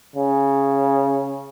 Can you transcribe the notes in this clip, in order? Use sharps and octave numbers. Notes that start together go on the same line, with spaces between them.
C#3